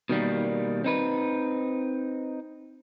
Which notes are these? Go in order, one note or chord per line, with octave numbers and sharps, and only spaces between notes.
B2 D#3 G3 A#3
C4 D#4 B4